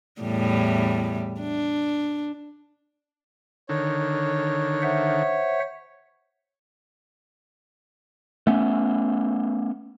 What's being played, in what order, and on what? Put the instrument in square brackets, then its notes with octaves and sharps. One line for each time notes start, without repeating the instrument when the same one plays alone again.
[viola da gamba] E2 A2 G3
D4
[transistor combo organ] D3 D#3 [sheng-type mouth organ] C#5
[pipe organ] C5 E5 F#5
[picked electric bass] A3 B3 C#4